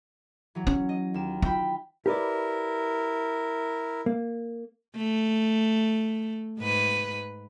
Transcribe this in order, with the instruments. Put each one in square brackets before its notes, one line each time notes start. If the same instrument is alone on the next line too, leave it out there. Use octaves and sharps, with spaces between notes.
[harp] E3 F#3
[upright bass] C#4
[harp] D#5
D#2 E7
[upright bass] F4 [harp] E5 G5 B5
[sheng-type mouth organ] E4 A#4 [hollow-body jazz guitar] G4 B4 D5
[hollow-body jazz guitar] A#3
[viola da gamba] A3
G#2 B4